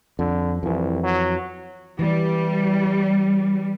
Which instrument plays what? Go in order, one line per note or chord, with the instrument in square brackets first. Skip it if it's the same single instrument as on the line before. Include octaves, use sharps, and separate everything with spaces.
[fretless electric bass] F2 [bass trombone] D3
[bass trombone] C2 [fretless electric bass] F2 E3
[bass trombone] F#3
[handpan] E3 [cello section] G3